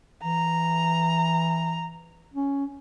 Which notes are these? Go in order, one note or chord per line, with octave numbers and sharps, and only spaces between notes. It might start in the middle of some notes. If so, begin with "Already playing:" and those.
E3 A#5
C#4